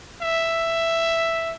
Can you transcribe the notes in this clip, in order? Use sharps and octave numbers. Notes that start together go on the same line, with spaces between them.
E5